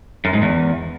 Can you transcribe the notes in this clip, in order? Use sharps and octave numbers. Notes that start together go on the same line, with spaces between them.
F#2
G#2
E2